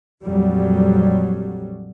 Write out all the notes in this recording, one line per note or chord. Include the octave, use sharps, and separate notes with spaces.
A#1 F2 F#3 G3